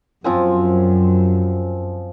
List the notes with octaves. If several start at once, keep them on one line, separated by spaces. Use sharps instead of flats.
F#2 F3 C4 G#5